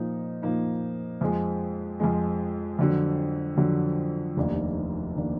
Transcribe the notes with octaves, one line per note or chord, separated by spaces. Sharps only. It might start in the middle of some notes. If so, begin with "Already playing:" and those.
Already playing: A#2 F3 A#3 D#4
A#2 F3 A#3 D#4
F2 F3 G#3
F2 F3 G#3
F2 D3 F#3
F2 D3 F#3
F1 D#2 D#3 A#3 D4
D#3 A#3 D4